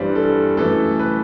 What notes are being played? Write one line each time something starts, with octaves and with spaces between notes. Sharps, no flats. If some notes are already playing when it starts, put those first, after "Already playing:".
Already playing: G2 E3 G3 C5
A4
F#2 E3 A3 A4
B4